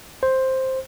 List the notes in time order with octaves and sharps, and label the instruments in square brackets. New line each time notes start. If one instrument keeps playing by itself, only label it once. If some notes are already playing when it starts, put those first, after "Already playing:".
[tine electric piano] C5